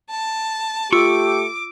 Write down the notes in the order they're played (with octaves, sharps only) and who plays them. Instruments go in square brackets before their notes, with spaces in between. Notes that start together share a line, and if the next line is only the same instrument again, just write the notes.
[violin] A5
[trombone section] A3 G4 [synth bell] F4 E6 [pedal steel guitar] C#6 [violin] D6